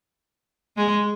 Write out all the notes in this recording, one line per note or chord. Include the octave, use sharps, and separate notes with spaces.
G#3